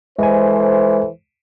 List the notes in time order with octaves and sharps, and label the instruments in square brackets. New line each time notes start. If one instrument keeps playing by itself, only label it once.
[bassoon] E3 [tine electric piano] G#3 G#5 [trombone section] A4 C5